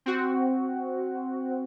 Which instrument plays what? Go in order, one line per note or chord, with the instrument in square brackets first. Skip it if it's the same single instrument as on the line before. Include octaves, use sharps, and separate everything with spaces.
[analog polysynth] C4 F#4